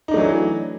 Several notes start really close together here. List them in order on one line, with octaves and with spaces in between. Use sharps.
D#4 D4 A3 F#3 E3